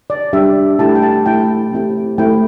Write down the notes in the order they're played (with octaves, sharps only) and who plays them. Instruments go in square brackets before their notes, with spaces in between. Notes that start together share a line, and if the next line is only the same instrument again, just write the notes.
[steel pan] D5
G3 D4 G4 E5
A3 E4 G4 A5
G5
A5
A3 E4 G4 G5
A3 C4 E4 G4
A3 C4 E4 G4 G5